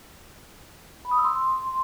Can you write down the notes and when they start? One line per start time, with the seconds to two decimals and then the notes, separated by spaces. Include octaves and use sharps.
1.05 B5
1.11 D#6
1.18 E6
1.25 C6